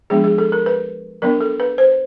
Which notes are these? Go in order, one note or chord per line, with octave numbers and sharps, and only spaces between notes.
F3 G#3 B3 D4 G#4
G#4
A4
A#4
B4
F#3 B3 D4 A#4
A4
B4
C5